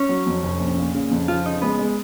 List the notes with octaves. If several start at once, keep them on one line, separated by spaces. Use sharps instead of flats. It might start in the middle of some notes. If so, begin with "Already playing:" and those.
Already playing: C#4
F#3
F2
F1
A#1
A#2
C#3
F2
F3 F4
C#3 D#4
G#3 B3
G#3